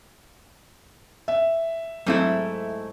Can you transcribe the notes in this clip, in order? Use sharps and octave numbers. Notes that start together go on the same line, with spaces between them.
E5
G#2 F#3 A3 C4 E4 G#4